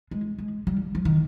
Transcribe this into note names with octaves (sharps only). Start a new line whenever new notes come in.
G#3
G#3
G3
F3
D#3